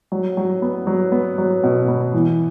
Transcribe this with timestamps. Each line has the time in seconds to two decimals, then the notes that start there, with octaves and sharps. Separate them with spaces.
0.12 F#3
0.37 F#3
0.62 B3
0.87 F#3
1.12 B3
1.38 F#3
1.63 B2
1.88 B3
2.14 E3